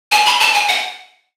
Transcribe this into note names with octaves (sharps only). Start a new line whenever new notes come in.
G#5
B5
A5
G#5
F#5